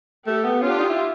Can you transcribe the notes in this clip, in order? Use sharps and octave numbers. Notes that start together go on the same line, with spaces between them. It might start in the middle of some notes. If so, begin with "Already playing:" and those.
A3 G4 A4
B3
C#4 F4 G4
D4
D#4
E4